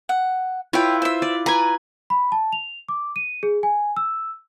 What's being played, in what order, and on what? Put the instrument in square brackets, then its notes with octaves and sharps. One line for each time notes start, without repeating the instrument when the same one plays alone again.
[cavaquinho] F#5
[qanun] E4 F4 B4 [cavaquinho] C#5 G5
[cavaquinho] C5 E5
[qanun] D5
[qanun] B4 G#5 [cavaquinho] A#5
[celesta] B5
A5
F7
D6
D#7
G#4
G#5
E6